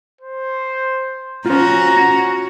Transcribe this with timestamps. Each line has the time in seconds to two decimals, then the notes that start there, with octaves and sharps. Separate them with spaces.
0.21 C5
1.46 C#4 F4 F#4 C5 A#5